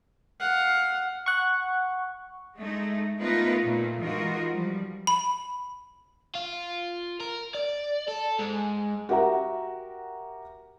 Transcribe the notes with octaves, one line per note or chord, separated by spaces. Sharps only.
F5 F#5
F#5 C#6
G#3 A3 D#4
A3 B3 D#4 F4 A#4 B4
A#2 A3
E3 G#3 D#4 F4 F#4 A#4
F3 G3
B5
F4
A#4
D5
A4
G#2
F#4 G4 A#4 E5 F#5 A#5